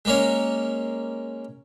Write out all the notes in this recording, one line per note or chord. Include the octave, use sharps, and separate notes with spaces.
G#3 A#3 C#4